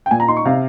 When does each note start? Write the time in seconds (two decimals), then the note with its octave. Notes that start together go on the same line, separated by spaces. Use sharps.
0.06 G5
0.11 A#2 G#5
0.20 A#5
0.28 D#4 C6
0.37 C#6
0.46 C3 F5